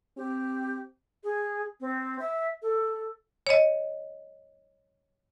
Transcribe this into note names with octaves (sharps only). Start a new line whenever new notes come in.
C4 G4
G#4
C4
E5
A4
C#5 D#5